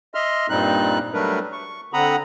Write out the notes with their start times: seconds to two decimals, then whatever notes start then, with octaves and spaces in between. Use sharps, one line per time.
0.15 D#5 E5 C6 F6
0.50 G2 A#2 G3 C4 D#4 F#6
1.14 F#3 G3 A3 D4 A#4 B4
1.52 C#6
1.93 D3 C4 F#5 A#5 B5 D#6